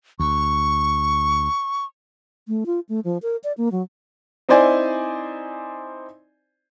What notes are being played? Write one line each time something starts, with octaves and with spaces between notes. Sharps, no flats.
D2 C#6
A3
F4
A3
F3
A#4
D5
A#3
F#3
C4 D#4 E4 C5 D5 G#5